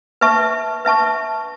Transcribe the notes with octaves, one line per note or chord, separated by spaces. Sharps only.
B4 E5 A5 C#6
B4 E5 A5 C#6